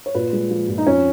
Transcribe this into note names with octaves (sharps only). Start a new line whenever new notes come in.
C#5
A#2 B4
G#3
F3
A#2
D#4
F2 C#4